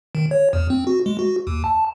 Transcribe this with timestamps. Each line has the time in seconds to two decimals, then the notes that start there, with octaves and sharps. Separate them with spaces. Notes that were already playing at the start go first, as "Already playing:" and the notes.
0.15 D#3
0.31 C#5
0.53 E2
0.70 C4
0.87 F#4
1.06 G#3
1.19 F#4
1.47 D#2
1.64 A5